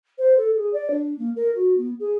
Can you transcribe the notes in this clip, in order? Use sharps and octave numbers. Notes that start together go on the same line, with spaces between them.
C5
A4
G#4
D5
D4
A#3
A#4
F#4
B3
G#4